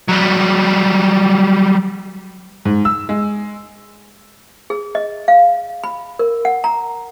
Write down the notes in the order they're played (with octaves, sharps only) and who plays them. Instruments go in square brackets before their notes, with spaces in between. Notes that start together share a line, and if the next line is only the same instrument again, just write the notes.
[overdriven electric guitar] F#3 G3
[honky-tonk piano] G#2
E6
G#3
[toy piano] G#4
D#5
F5
B5
A#4
F#5
A#5